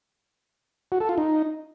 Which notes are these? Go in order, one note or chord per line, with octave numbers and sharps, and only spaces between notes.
F#4
A4
F4
D#4